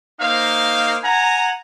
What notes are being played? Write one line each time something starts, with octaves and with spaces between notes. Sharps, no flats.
A#3 D#4 C5 F5
F#5 G#5 A#5